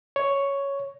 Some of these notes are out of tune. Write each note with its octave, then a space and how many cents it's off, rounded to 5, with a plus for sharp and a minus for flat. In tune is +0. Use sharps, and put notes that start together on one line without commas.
C#5 +5